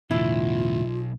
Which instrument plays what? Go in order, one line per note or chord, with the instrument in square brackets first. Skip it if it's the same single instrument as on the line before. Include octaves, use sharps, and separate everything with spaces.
[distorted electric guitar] B1 [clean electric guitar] E2 A2 D3 [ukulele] E4 [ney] F4